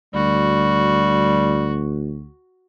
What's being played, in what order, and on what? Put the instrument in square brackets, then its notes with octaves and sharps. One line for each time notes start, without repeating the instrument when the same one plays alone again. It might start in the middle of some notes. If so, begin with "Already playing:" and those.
[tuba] D2 [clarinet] G3 [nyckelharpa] F#4